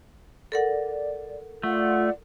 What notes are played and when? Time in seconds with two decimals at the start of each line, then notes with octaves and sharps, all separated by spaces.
0.52 A4 A#4 D5 F#5
1.63 A3 F4 D5 F#5